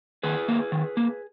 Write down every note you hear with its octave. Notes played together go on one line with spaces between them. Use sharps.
D#3 G#4 B4
A#3
D#3
A#3